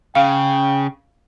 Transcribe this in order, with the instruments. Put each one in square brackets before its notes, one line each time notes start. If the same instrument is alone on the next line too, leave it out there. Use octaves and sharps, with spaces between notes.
[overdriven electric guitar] C#3 [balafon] F5 [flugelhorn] G5